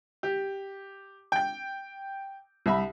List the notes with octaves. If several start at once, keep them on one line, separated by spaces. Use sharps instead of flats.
G4
G5 G6
C2 E5 B5